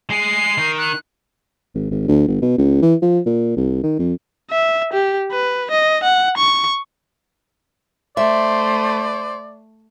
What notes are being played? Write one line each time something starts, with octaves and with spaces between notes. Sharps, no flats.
G#3 G#4 C7
D#3 D#4
F#6
G#1
G#1
D2
G1
B2
C#2
E3
F3
A#2
C2
D#3
F2
E5
G4
B4
D#5
F#5
C#6
A3 C5 D5 E5